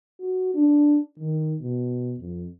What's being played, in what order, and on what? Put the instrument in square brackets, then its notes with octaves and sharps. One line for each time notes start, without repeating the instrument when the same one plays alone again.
[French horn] F#4
D4
D#3
B2
F2